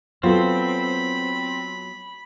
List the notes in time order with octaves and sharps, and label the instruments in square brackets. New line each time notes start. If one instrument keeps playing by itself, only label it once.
[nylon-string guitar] F#3 F4 [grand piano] B3 A4 [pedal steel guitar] C4 [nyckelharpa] B5